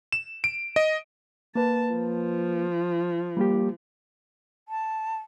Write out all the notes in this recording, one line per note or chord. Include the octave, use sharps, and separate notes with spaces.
E7
D7
D#5
A#3 B4 A5
F3
G3 A#3 G4
A5